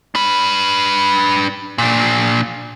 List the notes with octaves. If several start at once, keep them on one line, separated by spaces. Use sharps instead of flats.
D4 B4
A#2 D4